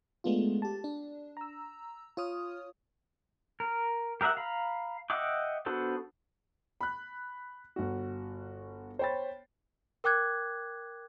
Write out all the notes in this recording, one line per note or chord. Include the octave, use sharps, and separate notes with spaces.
G#3 A3 B3 D4 F4
G4 A5
D4
A#5 E6
F4 C#5 D#6 F6
A#4
G4 A#4 D#5 E5 F#5
F5 A#5 B5
D#5 E5 F#5 G5 D6
B3 D4 F#4 A4 C5
B5 F#6
G1 F#4
C5 C#5 G5 B5 A6
A#4 G5 D6 F#6 G#6